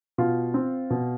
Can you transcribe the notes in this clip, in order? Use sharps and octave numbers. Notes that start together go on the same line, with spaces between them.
B2 F4
C4
B2